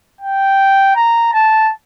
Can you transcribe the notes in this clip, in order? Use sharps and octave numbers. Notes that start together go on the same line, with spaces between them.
G5
A#5
A5